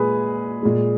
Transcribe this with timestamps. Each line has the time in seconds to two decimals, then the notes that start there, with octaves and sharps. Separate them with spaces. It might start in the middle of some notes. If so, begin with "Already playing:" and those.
Already playing: A#2 G#3 G#4 B4
0.63 A#2 G#3